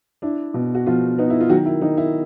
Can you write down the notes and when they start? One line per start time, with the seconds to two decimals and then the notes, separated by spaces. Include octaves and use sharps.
0.22 D4 E4
0.54 B2
0.75 F#4
0.86 B2 F3 F4
1.18 B3 D#4
1.30 E4
1.41 F4
1.50 D#3 F#3 F#4
1.66 E4
1.81 D#3 D#4
1.97 E4